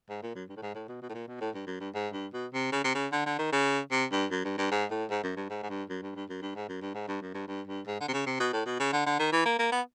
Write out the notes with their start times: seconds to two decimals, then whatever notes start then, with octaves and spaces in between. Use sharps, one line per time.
0.10 G#2
0.23 A#2
0.35 F#2
0.49 G2
0.57 A2
0.62 G#2
0.75 A2
0.89 B2
1.02 B2
1.09 A2
1.14 A#2
1.28 B2
1.41 A2
1.55 G2
1.67 F#2
1.80 G2
1.94 G#2
2.13 G2
2.33 B2
2.53 C3
2.72 C#3
2.84 C3
2.95 C#3
3.12 D3
3.26 D3
3.39 D#3
3.52 C#3
3.91 C3
4.12 G2
4.31 F#2
4.45 G2
4.58 G2
4.71 G#2
4.91 A2
5.10 G#2
5.23 F#2
5.37 G2
5.50 G#2
5.63 G#2
5.70 G2
5.89 F#2
6.02 G2
6.15 G2
6.29 F#2
6.42 G2
6.56 G#2
6.69 F#2
6.82 G2
6.95 G#2
7.08 G2
7.22 F#2
7.34 G2
7.48 G2
7.67 G2
7.87 G#2
8.00 D3
8.08 C3
8.14 C#3
8.27 C3
8.40 B2
8.53 A2
8.66 B2
8.80 C#3
8.93 D3
9.06 D3
9.19 D#3
9.32 E3
9.46 A#3
9.59 A#3
9.72 B3